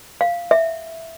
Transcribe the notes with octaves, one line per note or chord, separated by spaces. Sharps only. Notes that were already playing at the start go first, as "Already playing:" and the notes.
F5
E5